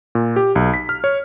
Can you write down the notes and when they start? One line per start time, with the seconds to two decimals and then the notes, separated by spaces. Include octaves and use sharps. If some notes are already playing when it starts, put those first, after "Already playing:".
0.15 A#2
0.36 G4
0.55 B1
0.74 B6
0.89 F6
1.04 C#5